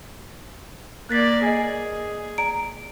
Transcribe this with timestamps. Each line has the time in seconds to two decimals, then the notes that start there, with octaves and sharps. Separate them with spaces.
1.09 A#3 D5 F#6 A6 B6
1.43 G#4 D#5 G#5
2.38 D5 A#5 D7